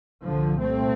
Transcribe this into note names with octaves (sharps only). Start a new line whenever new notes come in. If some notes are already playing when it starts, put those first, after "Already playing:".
C2 A#2 D3 F3
A3 C4